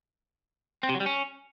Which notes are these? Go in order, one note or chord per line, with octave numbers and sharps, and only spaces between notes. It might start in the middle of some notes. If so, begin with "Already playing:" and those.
C4
C3
F#3
G3
C#4